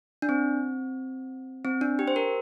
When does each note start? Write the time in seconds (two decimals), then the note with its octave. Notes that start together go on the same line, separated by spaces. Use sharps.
0.22 D4
0.29 C4
1.65 C4
1.81 D4
1.99 G4
2.08 C5
2.16 A#4